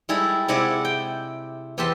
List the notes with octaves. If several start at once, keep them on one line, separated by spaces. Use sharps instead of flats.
G3 G#3 E4 G#4 A4
C3 G#3 E4 D5 F#5 G#5
G5
E2 B3 G4 E5 A5 C6